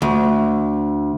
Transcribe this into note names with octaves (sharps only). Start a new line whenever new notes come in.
D2